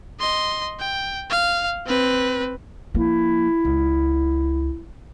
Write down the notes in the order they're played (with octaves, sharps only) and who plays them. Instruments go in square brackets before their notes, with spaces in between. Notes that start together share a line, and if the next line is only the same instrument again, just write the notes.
[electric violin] D#5 C6
G5
F5
C4 B4
[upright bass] F3 A#3 [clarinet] E4
[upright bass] C#2